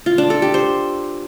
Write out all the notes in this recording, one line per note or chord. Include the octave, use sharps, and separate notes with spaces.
F4
D4
A4
G4
C5